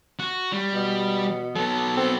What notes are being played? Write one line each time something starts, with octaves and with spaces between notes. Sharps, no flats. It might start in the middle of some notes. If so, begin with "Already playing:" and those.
F#4
G3
B2
F#3 B3 A4
C4 A4